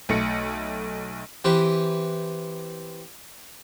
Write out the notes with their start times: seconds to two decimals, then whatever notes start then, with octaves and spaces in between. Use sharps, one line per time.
0.09 B1 A3 A#6 C#7
1.44 E3 C4 G4 B4